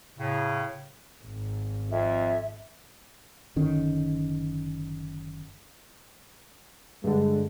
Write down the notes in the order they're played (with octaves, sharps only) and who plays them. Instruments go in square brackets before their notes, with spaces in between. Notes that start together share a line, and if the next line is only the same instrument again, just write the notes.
[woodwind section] A2 C#3
[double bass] G#1
[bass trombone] F2 [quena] E5
[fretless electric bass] F#1 D3 D#3 C#4
[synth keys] G2 D3 [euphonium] G#3